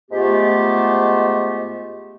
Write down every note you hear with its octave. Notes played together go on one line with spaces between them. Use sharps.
G#2 G#3 A3 B3 F4 G4